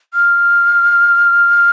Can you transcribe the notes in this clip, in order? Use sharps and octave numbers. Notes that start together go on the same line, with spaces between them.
F6